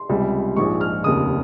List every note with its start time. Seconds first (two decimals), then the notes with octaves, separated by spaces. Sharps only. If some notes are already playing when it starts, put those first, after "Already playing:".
Already playing: C6
0.09 C#2 C3 G3
0.57 A#1 G#2 F3 G#3 C#6
0.81 F6
1.04 F1 D#2 C#3 D#6